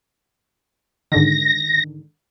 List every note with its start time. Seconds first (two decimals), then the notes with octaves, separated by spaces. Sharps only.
1.12 G#2 D3 D#3 A#6